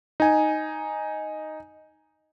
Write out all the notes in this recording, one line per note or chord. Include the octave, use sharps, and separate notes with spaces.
D#4 G#5